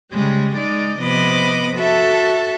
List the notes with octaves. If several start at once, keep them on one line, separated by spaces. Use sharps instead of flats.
C#3 G3 G#3
G#3 D#4 D5
C3 F3 B3 D#5 B5 D6
F#4 A4 E5 A5